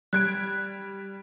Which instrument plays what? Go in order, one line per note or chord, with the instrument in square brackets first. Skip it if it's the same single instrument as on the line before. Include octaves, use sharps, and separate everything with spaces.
[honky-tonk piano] G3 G#6 D7 [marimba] F#6